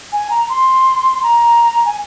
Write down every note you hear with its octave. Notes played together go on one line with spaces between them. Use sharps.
G#5
A#5
C6
A#5
G#5